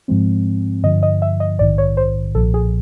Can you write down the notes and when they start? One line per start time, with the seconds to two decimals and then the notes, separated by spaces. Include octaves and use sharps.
0.08 G#2 F3 G#3 C4
0.83 G2 D3 F3 D#5
1.03 D#5
1.22 E5
1.40 D#5
1.59 A#1 G#2 D#3 D5
1.78 C#5
1.97 C5
2.35 B1 A#2 F3 A4
2.54 G#4